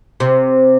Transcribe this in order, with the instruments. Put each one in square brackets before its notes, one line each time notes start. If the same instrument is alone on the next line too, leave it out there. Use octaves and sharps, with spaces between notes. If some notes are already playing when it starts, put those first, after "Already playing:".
[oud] C3